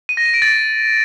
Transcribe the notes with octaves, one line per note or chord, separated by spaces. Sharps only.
D#7
A#6
D#7
D7
A6